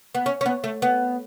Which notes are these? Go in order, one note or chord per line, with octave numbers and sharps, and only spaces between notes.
B3
C#4
C#4
B3
A3
B3